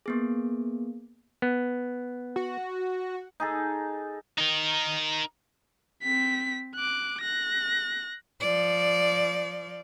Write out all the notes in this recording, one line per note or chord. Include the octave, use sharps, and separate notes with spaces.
A#3 B3 G#4
B3
F#4
D#4 G#4 A4
D#4 A#4
C4 B6
D6 F#6
F#6 A#6
F3 D5